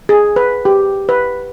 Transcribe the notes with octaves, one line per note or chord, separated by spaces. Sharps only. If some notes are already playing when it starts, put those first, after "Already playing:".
G#4
B4
G4
B4